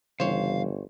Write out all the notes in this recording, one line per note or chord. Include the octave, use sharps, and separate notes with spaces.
G1 C#3 E3 G3 C5 C#5 F5